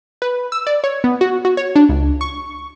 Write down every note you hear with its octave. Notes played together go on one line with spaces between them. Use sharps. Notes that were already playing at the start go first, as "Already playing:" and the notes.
B4
E6
D5
C#5
B3
F#4
F#4
C#5
D4
C#2
C#6